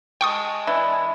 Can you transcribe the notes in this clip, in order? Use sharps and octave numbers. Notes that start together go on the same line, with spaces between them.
G#3 G5 A5 C#6 D#6
E3 D4 E4